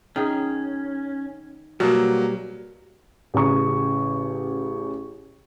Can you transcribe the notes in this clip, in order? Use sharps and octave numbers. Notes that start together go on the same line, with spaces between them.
D#3 C#4 G#4
B2 F#3 G3 A#3
A1 C#3 C#6